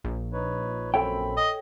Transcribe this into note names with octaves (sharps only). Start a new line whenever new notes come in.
A#1
D#4 B4 C#5
F#2 C4 A4 C#5 G5 B5
D#5